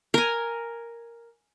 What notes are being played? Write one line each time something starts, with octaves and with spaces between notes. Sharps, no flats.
A#4 G#5